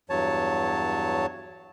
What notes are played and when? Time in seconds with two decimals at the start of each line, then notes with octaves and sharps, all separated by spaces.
0.10 E2 G2 F#3 C#5 A5